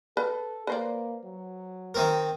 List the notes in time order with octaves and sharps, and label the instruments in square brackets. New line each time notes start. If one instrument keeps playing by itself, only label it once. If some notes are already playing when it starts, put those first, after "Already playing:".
[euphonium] A4 [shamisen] B4
[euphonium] A#3 [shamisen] B4 C5 D5
[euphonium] F#3
[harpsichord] D#3 C4 A#4